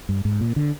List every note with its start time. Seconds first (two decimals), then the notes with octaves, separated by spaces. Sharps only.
0.09 G2
0.25 G#2
0.41 A#2
0.56 D3